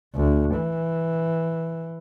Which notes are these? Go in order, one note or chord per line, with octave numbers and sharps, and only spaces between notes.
D2
E3